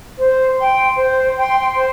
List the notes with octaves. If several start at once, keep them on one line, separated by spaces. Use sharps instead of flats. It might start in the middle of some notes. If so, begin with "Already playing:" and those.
C5
G5 C6
C5
G5 C6
C5